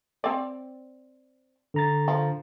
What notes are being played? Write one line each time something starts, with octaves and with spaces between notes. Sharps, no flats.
C4 D5
D3 A#5 A6
F3